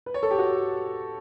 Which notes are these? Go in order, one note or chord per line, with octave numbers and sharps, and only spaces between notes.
B4
C#5
A4
G4
F#4